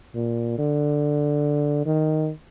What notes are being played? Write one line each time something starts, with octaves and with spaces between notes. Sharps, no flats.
A#2
D3
D#3